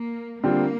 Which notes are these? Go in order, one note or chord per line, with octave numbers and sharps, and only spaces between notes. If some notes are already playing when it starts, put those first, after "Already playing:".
Already playing: A#3
D3 G3 A#3 C4 F4